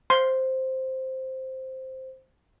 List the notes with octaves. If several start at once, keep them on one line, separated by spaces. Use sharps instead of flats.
C5 C6